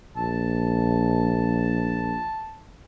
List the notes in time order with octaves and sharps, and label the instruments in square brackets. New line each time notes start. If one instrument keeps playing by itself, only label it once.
[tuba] A#1 [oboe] A5